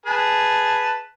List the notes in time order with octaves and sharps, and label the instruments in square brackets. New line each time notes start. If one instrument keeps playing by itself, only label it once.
[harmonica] G#4 B4 A5